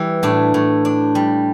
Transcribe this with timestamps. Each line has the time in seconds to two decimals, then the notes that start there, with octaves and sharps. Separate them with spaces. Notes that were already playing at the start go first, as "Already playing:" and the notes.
Already playing: E3 G3
0.23 A2 D4
0.54 A2
0.85 D4
1.15 G3